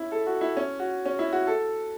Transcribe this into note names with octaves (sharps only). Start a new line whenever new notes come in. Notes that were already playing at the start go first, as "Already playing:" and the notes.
Already playing: C#4 E4
A4
F#4
E4
C#4
F#4
C#4
E4
F#4
A4